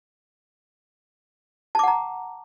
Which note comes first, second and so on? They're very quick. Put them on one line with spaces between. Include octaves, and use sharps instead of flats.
A5 D6 F#5 A#5